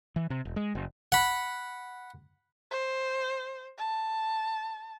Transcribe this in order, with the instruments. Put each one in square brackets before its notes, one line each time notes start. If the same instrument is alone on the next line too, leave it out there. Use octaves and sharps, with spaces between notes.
[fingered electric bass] E3
C3
E1
G#3
F#1
[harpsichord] F#5 B5
[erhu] C5
A5